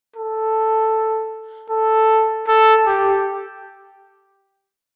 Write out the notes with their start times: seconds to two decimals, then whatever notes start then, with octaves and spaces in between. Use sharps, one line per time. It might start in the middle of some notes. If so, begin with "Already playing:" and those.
0.16 A4
1.70 A4
2.47 A4
2.86 G4